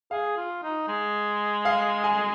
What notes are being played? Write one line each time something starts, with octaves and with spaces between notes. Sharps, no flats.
G#4 F5
F4
D#4
G#3
F5
G#5